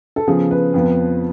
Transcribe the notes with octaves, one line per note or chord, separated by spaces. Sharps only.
A4
C#3 F3 B3 G#4
B4
F2 F3 B3